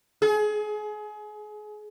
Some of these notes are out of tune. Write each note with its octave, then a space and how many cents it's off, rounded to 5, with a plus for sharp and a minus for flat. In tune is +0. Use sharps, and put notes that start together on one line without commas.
G#4 +30